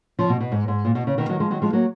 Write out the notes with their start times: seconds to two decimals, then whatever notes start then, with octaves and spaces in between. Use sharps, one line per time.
0.19 C#3 F3
0.29 B2
0.40 B2
0.52 G#2
0.68 G#2
0.85 A#2
0.95 B2
1.07 C#3
1.18 B2 D#3
1.29 D#3 F#3
1.40 F3 G#3
1.50 D#3 F#3
1.62 F3 G#3
1.73 F#3 A#3